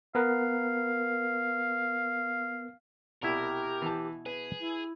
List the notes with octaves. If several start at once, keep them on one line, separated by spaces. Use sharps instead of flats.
B3 A#4 B4 F5
C2 B2 E4 G4 A#4
E3 A5
G#4 B4
E4